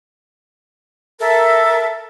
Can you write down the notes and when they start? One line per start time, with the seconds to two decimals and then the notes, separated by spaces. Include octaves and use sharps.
1.20 A4 A#4 E5